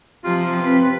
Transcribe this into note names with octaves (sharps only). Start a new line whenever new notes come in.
C3 F3 C4 F4
C4 B4